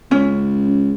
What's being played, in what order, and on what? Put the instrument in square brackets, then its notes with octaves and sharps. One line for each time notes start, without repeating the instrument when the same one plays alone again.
[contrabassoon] C#2 [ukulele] C#4